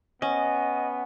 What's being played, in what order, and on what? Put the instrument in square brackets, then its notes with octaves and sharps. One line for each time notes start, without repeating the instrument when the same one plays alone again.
[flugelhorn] B3 [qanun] C#4 [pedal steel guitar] D#5